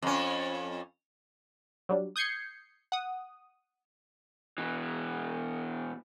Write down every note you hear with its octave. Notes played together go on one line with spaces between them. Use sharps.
F2 C#4
F#3 G3 D4
D#6 G6 G#6 C7 C#7
F#5 D#6
B2 E3